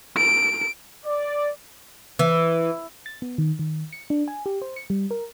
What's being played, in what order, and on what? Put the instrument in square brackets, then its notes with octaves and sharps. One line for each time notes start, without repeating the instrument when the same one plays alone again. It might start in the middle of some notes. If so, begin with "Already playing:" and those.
[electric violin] D7
[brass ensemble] D5
[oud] E3
[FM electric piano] A6
B3
D#3
D#3
C#7
D4
G#5
G4
C5
C#7
G3
A#4